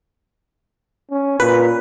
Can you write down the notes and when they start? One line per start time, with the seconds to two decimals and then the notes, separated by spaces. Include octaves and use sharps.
1.11 C#4
1.40 A#2 B4